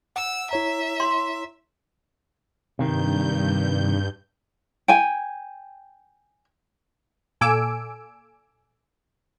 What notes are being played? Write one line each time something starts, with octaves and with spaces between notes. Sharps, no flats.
F#5 E6
E4 C#5 E5 A#5
C6
G2 C3 D#3 G6
G5 G#5
A#2 A4 G#5 D6 E6 D7